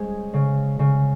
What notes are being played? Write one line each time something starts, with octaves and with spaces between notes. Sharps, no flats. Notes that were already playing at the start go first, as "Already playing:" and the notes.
Already playing: G#3 C#4 G#4 C5
C#3
C#3